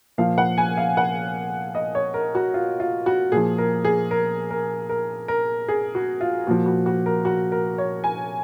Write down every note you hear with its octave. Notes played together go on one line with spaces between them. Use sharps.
A#2 F3 F5
F#5
G#5
F5
F#5
D#5
C#5
A#4
F#4
F4
F4
F#4
A#2 F3 G#4
A#4
G#4
A#4
A#4
A#4
A#4
G#4
F#4
F4
A#2 F3 F#4
F#4
F#4
A#4
F#4
A#4
C#5
G#5